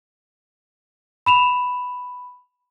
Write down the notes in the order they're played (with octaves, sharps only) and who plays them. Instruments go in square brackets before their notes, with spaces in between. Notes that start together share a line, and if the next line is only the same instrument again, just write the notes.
[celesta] B5 E7 F7